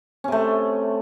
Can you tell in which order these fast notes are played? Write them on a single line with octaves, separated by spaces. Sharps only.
C#4 C3 A3